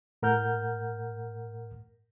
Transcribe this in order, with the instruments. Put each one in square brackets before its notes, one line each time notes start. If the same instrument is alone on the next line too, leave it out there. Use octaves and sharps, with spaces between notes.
[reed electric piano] A2 A#4 F#5 F6 G6